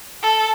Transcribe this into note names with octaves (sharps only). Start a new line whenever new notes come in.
A4